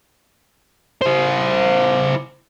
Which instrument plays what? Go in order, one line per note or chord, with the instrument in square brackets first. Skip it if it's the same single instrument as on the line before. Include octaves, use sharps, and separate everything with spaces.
[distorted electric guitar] E4 C5